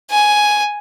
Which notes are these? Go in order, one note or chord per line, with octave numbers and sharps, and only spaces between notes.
G#5